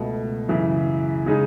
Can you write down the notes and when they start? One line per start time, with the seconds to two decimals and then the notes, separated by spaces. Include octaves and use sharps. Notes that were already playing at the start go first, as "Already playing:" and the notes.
Already playing: C#2 B2 A3
0.48 F#2 C#3 E3
1.26 C#3 G#3 D#4 G#4